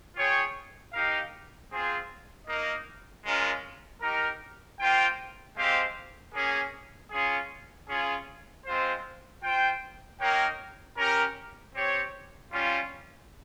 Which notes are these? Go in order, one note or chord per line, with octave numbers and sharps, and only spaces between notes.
F4 G#4 C#5 G5
D#4 G4 A#4 F5
C4 F4 G#4 C5
A#3 D#4 A#4 D#5
G#3 C#4 F4 A#4
D#4 G4 A#4
A#3 F4 C5 G5
G#3 C4 G4 C5 F5
A#3 C#4 G#4
C#4 F4 G#4
C#4 F4 G#4
G#3 C4 F4 C5
F4 C5 G5
A#3 D#4 A#4 C#5 G5
C#4 G4 A#4
C4 G4 C#5
G3 C#4 F4